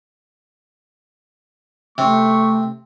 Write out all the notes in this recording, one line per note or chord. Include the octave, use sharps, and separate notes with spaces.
C3 A3 C#6